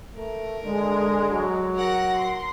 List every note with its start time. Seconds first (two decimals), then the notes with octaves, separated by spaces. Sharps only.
0.15 A3 A#4
0.64 D3 G#3
1.31 F#3
1.74 A#4 F#5 A#6
2.13 C6